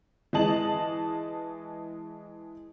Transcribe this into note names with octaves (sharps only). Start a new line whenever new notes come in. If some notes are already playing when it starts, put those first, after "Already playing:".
E3 G#3 D#5 A5 F#7